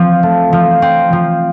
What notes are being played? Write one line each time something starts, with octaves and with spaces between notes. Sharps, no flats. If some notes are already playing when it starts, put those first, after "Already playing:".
Already playing: F3 C4
A3
F3
C4
F3